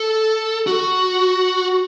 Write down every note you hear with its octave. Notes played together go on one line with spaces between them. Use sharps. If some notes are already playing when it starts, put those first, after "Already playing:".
Already playing: A4
F#4